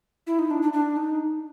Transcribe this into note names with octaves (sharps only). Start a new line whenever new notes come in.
E4
D#4
D4
D4
D4
D#4